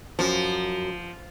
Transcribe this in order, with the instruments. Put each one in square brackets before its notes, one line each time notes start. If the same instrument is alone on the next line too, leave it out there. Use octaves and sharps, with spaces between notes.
[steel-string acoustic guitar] F#2 [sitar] F3